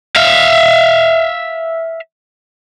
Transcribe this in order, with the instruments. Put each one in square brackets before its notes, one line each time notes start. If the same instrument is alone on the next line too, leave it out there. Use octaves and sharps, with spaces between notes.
[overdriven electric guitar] E5 F5